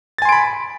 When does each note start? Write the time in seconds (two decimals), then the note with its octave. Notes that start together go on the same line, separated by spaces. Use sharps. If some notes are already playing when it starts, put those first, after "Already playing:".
0.18 A6
0.22 G#5
0.25 C6
0.29 D7
0.32 B5